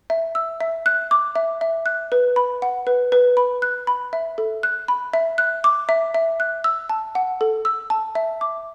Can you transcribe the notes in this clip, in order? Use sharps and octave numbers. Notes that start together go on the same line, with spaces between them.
E5
E6
E5
F#6
D6
E5
E5
F#6
B4
B5
F#5
B4
B4
B5
F#6
B5
E5
A4
F#6
B5
E5
F#6
D6
E5
E5
F#6
E6
A5
F#5
A4
E6
A5
E5
D6